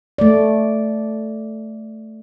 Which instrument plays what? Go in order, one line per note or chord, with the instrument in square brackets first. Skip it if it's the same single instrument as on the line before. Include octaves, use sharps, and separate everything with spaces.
[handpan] A3 D5